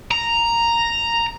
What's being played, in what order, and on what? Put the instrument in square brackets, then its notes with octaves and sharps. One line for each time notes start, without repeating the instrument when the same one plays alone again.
[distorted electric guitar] A#5